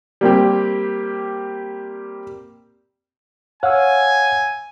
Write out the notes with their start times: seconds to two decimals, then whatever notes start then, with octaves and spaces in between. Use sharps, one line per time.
0.21 G3 A#3 C4 G4
3.63 C#5 F5 F#5 G#5 E6